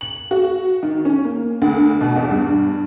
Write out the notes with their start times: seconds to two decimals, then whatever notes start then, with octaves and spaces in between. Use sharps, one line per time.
0.01 F#7
0.31 F#4
0.83 D#3
1.05 C#4
1.25 A#3
1.62 D2
2.01 B2
2.16 E2
2.31 G2